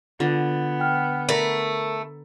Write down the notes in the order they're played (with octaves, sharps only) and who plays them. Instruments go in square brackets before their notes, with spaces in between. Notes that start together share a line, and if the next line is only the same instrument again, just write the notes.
[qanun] D3 [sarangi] B3 [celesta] F4
[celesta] G5 F6
[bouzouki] A3 [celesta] A#4 [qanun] A#5 B5